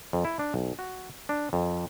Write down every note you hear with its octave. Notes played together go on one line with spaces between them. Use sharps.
F2
E4
D4
B1
F#4
D4
F2